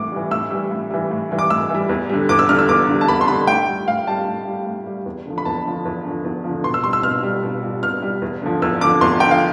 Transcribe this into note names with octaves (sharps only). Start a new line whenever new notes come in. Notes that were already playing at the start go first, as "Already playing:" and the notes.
Already playing: A2 E3 G3 D6
E3 G3
A2 E6
E3 G3
A2
E3 G3
A2
E3 G3
D6
A2 E6
E3 G3
E2
D3 G3
E2 D6
E6
D3 G3 F6
E6
E2 D6
D3 G3
A5
E2 B5
C6
D3 G3 B5
A2 G5
G3
A2 F5
G3 A5
A2
G3
A2
G3
E2
D3 F3
B5
E2 A5
D3 F3
E2
D3 F3
E2
D3 F3
B2 C6
E6
G3 C6
E6
B2 F6
G3
B2
G3
B2 F6
G3
E2
D3 F3
E2 E6
D3 F3 D6
E2 C6
D3 F3 G5
F5